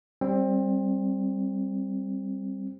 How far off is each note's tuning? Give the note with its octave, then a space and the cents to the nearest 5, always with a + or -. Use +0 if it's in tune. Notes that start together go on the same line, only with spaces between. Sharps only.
G3 +0 C4 +20